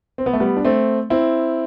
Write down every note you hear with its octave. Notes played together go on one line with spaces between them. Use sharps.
C4
B3
A3
G3 B3
D4
A3 C4
C4 E4